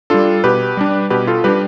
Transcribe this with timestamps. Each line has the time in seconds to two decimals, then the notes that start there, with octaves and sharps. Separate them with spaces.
0.10 G3 D4 F4 A4
0.44 B2 G4 B4
0.77 G3 D4
1.10 B2 G4 B4
1.27 F4 A4
1.44 G3 D4 G4 B4